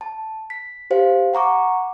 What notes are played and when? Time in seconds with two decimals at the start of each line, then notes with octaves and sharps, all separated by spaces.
0.01 A5
0.50 B6
0.90 G4 C5 F5
1.34 F#5 A#5 C#6 D6